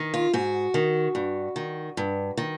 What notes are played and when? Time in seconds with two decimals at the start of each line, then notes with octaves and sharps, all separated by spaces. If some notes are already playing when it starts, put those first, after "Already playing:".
Already playing: D#3
0.14 F4
0.33 G#2 F#4
0.74 D#3
1.15 G2
1.56 D#3
1.97 G2
2.37 D#3